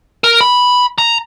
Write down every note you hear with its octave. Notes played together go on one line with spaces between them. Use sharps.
A#4
B5
A#5